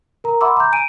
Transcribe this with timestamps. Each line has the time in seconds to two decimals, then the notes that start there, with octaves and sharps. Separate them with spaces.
0.24 A#4 A#5
0.41 E5 F#5 B5 C6 D6 E6
0.57 A#5 G6
0.72 G#5 D7 D#7